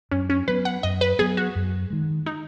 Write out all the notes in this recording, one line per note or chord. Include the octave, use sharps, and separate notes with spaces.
F#2 C#4
C#4
F#3 B3 B4
F#5
F#2 D#5
B4
F#3 B3 G#4
F#4
F#2
D#3 G#3
D#4